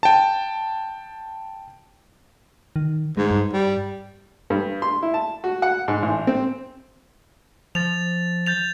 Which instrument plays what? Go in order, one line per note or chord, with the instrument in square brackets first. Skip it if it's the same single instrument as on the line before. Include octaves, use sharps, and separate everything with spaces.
[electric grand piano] G5 A5
[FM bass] D#3
[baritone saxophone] G#2 [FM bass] G#3
[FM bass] G2
[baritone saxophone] G3
[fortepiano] G2
C6
E4
A5
F#4
F#5
G#2
A1
C4
[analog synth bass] F3 [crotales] A6 F7
[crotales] G6 A6 F7